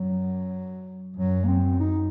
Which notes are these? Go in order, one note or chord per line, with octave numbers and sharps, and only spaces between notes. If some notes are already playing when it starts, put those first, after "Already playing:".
Already playing: F#2 F#3
F#2 F#3
A#3
C4
D#4